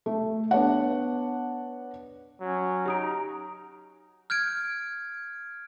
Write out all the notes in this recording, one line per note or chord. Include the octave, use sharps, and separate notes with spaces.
A3
B3 D4 C#5 F#5
F#3 C#4
D#4 G4 A#5 D#6 D7
F6 G6 G#6 D7